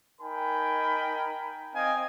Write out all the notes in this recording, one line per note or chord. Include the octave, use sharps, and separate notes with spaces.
D#4 A#4 G5 G#5 B5
C4 D#5 F5 G5 G#5